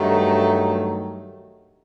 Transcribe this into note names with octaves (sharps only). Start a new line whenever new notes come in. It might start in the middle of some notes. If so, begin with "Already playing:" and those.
Already playing: G2 D#3 F#3 A3